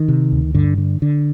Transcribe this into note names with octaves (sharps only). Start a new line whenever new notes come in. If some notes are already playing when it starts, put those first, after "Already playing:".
Already playing: D#3
C3
D2
G2 D3
D3
D3